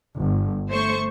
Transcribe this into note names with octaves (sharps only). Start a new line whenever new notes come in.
G1
A3 C5 C#6